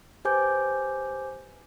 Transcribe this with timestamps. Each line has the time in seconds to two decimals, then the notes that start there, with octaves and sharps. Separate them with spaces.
0.25 G4 B4 C5 G#5 D6 G6